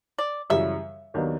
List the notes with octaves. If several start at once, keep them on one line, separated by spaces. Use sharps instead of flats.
D5
F#2 C#3 E3 G3 E5
D#2 D#3 F#3 B3 D4